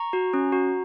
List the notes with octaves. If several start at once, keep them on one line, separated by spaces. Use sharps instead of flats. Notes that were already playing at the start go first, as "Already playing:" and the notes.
Already playing: A#5 C#6
F#4
C#4
F#4